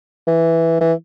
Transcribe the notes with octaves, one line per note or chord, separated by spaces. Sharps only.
E3
E3